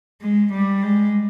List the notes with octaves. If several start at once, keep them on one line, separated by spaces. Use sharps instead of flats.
G#3
G3
G#3